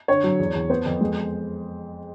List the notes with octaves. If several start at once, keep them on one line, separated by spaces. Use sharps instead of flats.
D3 C#5
F#3
E2
E2
B3 C5
F2
G#3